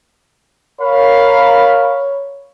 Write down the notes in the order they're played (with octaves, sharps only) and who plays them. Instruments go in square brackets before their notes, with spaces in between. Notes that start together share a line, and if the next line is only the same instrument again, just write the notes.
[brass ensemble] A#4 F5 [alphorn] C#5 [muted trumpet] B5